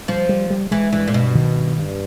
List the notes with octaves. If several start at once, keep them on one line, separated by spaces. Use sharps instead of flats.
F3 G3
G3
G3
E3 G#3
G2 E3
A#2
G2 B2
D#3
G2
G2